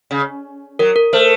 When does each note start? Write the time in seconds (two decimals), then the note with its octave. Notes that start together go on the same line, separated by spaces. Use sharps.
0.11 C#3
0.79 F#3 A#4
0.96 A#4
1.13 A3 C5